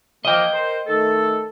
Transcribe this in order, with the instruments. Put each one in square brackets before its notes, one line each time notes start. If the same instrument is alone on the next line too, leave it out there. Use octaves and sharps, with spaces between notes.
[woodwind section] F3 A#3 [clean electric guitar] D#5 G5
[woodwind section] A#4 C5
D#3 A3 A4